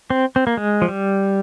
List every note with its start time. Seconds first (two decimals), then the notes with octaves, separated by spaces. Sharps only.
0.10 C4
0.36 C4
0.47 A#3
0.57 G#3
0.82 F3
0.88 G3